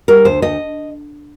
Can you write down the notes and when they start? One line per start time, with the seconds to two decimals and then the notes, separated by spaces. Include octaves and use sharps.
0.08 G3 A#4
0.25 D2 C5
0.42 D2 D#5